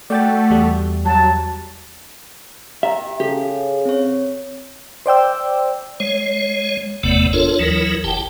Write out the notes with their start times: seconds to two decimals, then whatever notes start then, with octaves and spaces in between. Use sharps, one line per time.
0.10 A3 F#4 D5 G5 A6
0.51 E2 G3
1.05 F#3 A5
2.83 G4 E5 A#5
3.20 C#3 G4 A4
3.85 C4 C#5
5.06 C5 D5 G5 E6
6.00 G#3 C#5
7.03 F#1 E2 C3 A3 B3 D5
7.33 D4 F4 A4 A#4 C#5
7.59 D#2 E3 F#3 E4 A#4
8.04 F#1 G4 G5 A5